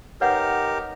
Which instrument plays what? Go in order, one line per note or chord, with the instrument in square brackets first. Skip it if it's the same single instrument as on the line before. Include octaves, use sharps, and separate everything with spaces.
[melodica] D#4 G4 A#4 [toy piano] B4 C#5 F#5